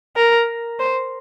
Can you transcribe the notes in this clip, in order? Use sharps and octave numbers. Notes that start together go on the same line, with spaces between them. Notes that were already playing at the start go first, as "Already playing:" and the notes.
A#4
C5